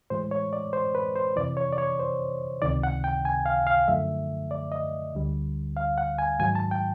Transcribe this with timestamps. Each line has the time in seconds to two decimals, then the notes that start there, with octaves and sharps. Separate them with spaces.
0.10 A2 E3 G#3 C5
0.31 C#5
0.53 D5
0.73 C5
0.95 B4
1.16 C5
1.36 F2 C3 E3 D5
1.57 C#5
1.72 D5
1.78 C#5
1.99 C5
2.62 C#2 C3 D#3 D5
2.83 F#5
3.04 G5
3.25 G#5
3.46 F5
3.67 F5
3.88 F#2 D3 F3 A3 E5
4.51 D5
4.72 D#5
5.14 D2 D3 G3
5.76 F5
5.98 F#5
6.19 G#5
6.39 G#2 D#3 F#3 G#5
6.55 A5
6.71 G5